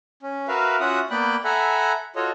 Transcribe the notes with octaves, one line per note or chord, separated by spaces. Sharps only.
C#4
F#4 A#4 B4 E5 F5
C#4 F4 F#4 E5 F#5 D#6
A#3 B3 D5 G5 B5 F#6
A4 E5 F#5 G#5 A#5 B5
F4 F#4 A4 C#5 D#5